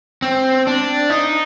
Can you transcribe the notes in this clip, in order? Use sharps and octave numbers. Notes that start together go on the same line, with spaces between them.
C4
D4
D#4